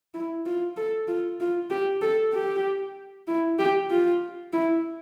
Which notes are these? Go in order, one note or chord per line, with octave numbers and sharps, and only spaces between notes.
E4
F4
A4
F4
F4
G4
A4
G4
E4
G4
F4
E4